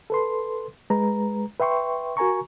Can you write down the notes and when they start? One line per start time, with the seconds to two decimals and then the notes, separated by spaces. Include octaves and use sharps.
0.10 A4 B4 C6
0.90 G#3 B4 A#5
1.60 B4 E5 G5 C6 C#6
2.17 F#4 A#4 G#5 A#5 C#6